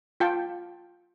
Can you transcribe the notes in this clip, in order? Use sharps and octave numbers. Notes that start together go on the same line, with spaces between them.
F4 G5 A5